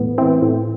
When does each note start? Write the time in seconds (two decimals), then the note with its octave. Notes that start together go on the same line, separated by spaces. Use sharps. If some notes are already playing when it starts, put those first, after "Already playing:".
Already playing: A2 E3 B3
0.18 E3 C4
0.42 A2